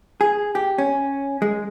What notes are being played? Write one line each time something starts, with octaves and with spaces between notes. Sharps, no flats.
G#4
G4
C#4
G#3